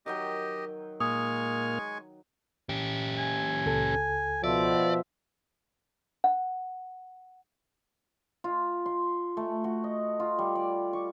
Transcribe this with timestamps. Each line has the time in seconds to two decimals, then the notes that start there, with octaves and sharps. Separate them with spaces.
0.06 D#3 F#3 G4 D#5 G5
1.00 A#2 G#3 A#3 G#5 C#6 D#6 F6
2.69 C#4 G4
3.18 G#5
3.66 C#2 A4
4.44 B2 F3 D5 E5
6.24 F#5
8.44 F4
8.86 C6
9.37 A3
9.64 F#4
9.84 D#5
10.20 F4
10.39 G3
10.55 D5
10.93 C#6